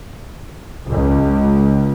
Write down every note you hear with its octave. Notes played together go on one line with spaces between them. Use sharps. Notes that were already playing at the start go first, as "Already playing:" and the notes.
C#2